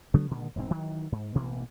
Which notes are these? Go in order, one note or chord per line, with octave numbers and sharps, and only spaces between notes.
C#3 F#3 A3 B3
A#2 D3 D#3 G#3
E1 G#2 G3 C4
D#3 E3 F#3
G#2
A1 B2 E3 A#3